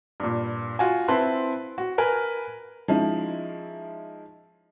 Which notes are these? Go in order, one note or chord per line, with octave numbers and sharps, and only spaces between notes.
G2 A#2
F4 F#4 G#5
C4 E4 B4 A5 C6
F#4
A#4 B4 G#5
F3 G#3 C#4 D#4 E4